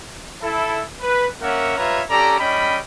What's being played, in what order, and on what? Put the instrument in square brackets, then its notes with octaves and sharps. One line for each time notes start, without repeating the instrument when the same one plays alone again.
[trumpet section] E4 A4
B4
A#3 C#4 A#4 E5 F#5
G3 F4 B4 C#5 E5 A#5
C#4 G4 A4 D5 A#5
G3 C#4 D#5 G5 B5